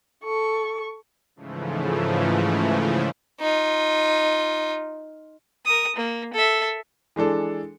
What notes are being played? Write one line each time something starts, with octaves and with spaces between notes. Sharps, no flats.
A4 C#6
G#2 C#3 E3 F3 A3
D#4 F4
A#4 D#6
A#3
A4 E5
E3 G#3 D4 A4